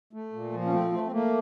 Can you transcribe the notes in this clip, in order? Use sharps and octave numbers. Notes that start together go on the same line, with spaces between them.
A3
A#2
F3
C#4
A3 C4
A3
C4
A3 A#3